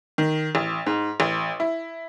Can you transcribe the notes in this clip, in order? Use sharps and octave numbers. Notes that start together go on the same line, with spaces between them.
D#3
A1
G#2
A1
E4